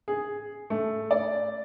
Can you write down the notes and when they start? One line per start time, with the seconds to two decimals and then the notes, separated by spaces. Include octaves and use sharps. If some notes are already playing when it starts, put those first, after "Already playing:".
0.08 G#4
0.70 A3
1.11 D5